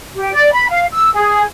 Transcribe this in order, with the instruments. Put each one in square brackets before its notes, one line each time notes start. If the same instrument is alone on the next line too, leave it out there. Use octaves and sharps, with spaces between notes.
[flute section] G4
D5
B5
F5
E6
G#4